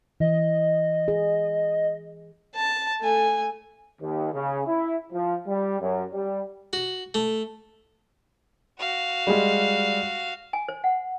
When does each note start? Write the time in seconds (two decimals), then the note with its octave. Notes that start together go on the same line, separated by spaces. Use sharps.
0.20 E3 D#5
1.08 G#4
2.55 A5
3.01 A3 G#5
4.01 D#2
4.33 C#3
4.67 E4
5.13 F3
5.47 G3
5.81 F#2
6.13 G3
6.73 F#4
7.14 A3
8.79 F#4 F5
9.27 G3 G#3
10.53 G#5
10.68 C5
10.84 F#5